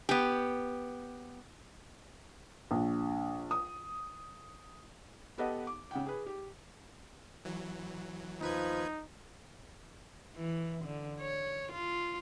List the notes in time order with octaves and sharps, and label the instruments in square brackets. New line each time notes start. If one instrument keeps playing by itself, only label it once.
[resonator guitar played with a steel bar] B3 G4
[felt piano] A#1
D#6
B3 G4 A4 B4 D#5 F#5
D6
C#3 F#5 G5
G#4 B4
G4
[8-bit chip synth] E3 F#3
[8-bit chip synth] D#2 B4 G#6 [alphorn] F3 [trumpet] D#4
[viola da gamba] E3
D3
C#5
F4